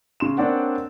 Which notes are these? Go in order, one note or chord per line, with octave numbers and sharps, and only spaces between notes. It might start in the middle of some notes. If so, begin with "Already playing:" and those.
C#3 C6 E7
A#3 C4 D4 C#5 D5 F#5